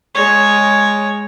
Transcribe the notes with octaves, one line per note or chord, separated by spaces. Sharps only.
G#3 C#5